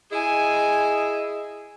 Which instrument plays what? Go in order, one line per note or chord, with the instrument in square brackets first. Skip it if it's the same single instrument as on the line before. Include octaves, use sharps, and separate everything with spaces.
[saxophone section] E4 G#4 D#5 [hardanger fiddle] G#5